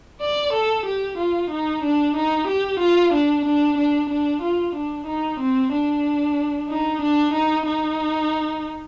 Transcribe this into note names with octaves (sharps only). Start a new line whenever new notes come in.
D5
A4
G4
F4
D#4
D4
D#4
G4
F4
D4
D4
D4
D4
F4
D4
D#4
C4
D4
D#4
D4
D#4
D#4